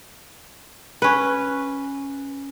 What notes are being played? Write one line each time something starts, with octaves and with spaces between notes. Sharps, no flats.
C#4 B4